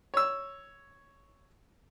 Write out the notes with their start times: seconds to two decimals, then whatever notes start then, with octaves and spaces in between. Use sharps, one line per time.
0.14 C#5 E6